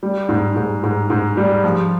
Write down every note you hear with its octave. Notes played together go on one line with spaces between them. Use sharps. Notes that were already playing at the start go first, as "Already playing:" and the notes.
G3
G#2
G#2
G#2
G#2
G3
F3